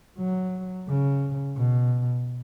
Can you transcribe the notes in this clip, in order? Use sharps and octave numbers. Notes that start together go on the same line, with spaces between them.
F#3
C#3
B2